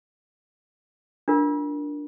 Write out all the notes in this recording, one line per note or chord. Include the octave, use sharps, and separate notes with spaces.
D4 F4 A#4